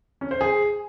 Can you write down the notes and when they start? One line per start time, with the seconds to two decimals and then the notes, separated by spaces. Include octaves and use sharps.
0.21 C#4
0.31 C5
0.41 G#4